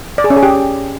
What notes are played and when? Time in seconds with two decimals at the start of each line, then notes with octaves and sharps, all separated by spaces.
0.18 D5
0.24 G#4
0.30 C#4
0.37 G#4
0.43 G4